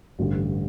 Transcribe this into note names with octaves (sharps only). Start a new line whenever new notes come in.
A1 G2 D3